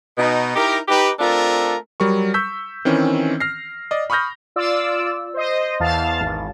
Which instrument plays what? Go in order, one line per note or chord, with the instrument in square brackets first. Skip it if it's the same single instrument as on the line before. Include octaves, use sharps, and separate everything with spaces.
[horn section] B2 D#4
D#4 E4 G4 A#4
D#4 G4 B4
A3 C4 D4 F4 A4 A#4
[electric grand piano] F#3 G3 A#4 C#6
C#6 E6 G6 B6
D#3 E3 C4 C#4
F6 A#6 C7
D5 D#5
B5 C#6 D#6 F6 G6 A#6
[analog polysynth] F4 D5 E6
C5 D#5
E2 F5 A5 A6
G#1